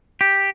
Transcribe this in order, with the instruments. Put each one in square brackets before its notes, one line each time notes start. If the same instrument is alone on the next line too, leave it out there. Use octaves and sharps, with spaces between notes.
[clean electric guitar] G4